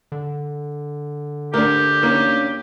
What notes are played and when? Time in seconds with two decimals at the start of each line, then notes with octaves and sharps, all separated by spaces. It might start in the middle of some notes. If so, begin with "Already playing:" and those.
0.12 D3
1.54 D2 D4 G4 A#4
2.03 A#3 C#4